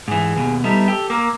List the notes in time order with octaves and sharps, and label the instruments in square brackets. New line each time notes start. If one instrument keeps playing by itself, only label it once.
[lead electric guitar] G#2 E3 [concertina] G#4
[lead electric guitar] D#2 B2
[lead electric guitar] G3 B3 [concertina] D#4 A4 E5
[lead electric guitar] G4 [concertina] A4
[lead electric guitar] A#3 [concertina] A#4 D6 E6